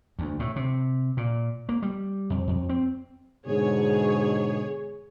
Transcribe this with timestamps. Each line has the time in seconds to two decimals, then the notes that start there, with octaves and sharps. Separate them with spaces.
0.19 D2
0.39 A2
0.56 C3
1.17 A#2
1.69 A#3
1.82 G3
2.30 F2
2.48 F2
2.69 C4
3.46 G#2 B2 D3 G#4 C#5